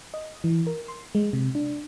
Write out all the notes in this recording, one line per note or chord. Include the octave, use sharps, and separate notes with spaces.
D#5
E3
A#4
C6
G#3
C3
D4